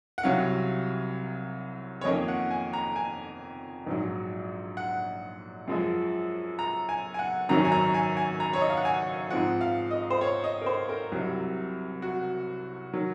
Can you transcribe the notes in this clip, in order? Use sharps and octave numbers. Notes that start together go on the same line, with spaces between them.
F#5
C2 C3 F#3 C#4 F5
C#5
F2 D#3 A#3 C#4 D#5
F#5
G#5
A#5
G#5
A#1 G#2 F#3
F#5
F#2 F3 G#3
A#5
G#5
G#5
F#5
G#1 F#2 D#3 F#3 C#4 A#5
G#5
A#5
G#5
G#5
A#5
C#5
D#5
F5
F#5
G#5
G#2 F3 C4 F#5
F5
D#5
C5
C#5
D#5
A#4
C5
A#4
C2 C3 F#3
F#4
D#3 F#3